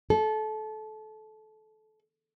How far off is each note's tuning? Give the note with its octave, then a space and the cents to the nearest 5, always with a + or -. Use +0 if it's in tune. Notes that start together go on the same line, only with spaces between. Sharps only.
A4 -25